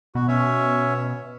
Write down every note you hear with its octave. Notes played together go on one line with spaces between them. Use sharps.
B2 F#4
C#4 C#5 E5